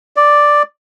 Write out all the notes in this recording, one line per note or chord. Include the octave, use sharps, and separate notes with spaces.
D5